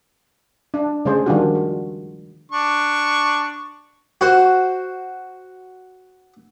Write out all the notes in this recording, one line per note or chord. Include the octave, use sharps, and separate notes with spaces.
D4
C#3 G#3 A3 G#4 C5
D#3 F3 G3 D4 F4 F#4
F#4
D4 C#6
F#4 C5